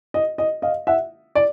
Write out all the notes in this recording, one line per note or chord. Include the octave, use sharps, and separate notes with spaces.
D#5
D#5
D#5 F5
E5 F#5
D5